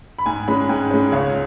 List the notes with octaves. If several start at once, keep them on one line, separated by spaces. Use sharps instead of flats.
B5
G#2 G#5
G#3 C#4 B5
G#2
G#3 C#4
C#2 C#5